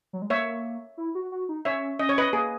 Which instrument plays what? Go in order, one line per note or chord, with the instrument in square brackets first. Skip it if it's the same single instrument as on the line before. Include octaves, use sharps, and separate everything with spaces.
[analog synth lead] F#3
G#3
[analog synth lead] A#3 [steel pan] C#5 E5
[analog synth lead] E4
F#4
F#4
D#4
[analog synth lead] C#4 [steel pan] C#5 E5
[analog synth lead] C#4 [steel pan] D#5
[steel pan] C#5
B4 D#5
[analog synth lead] A#3 [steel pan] G#4